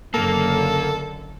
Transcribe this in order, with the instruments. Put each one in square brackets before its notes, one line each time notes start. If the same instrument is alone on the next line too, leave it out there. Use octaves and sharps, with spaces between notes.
[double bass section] F#1 F#2 D3 [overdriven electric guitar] A#3 [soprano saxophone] A4